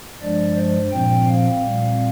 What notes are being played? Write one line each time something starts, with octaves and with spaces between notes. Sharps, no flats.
G2 F3 G#3 D4 D5
C5
A#2 F3 C4 G5
F5
A#2 G3 C4